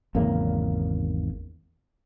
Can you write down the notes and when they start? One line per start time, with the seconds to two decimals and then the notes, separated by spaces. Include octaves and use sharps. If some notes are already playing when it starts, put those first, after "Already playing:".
0.15 G#1 E2 C#3 A#3